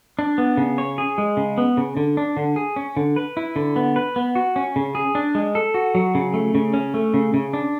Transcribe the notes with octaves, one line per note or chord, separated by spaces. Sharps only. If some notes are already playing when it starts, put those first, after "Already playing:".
D4
B3
C#3
C#5
G#4
G#3
C#3
B3
C#3
D3
D4
D3
G#4
C#4
D3
B4
E4
D3
B3
B4
B3
F#4
C#4
C#3
G#4
D4
G#3
A4
F#4
F#3
C#3
A3
C#3
C#4
A3
C#3
C#3
D4